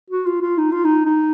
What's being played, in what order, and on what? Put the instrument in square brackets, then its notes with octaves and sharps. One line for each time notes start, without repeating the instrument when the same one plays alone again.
[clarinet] F#4
F4
F4
D#4
F4
D#4
D#4